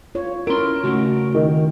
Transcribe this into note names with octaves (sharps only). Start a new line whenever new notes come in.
F4 C#5
C#4 E4 A#4 C6 D7
C#3 A3 D#4 F#4 A#4
D#3